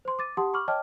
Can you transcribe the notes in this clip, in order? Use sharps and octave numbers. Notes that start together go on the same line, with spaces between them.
C5 C6
D6 A6 D#7
G4 F#5 A5 C6 D#6
B5 C#6 D6 F6 F#7
C#5 D#5 G5 A5 D6 F6